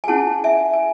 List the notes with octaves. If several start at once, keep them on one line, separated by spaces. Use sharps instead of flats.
G#5
C#4 E4 G#4 F#5 A5
E5 G#5
G#5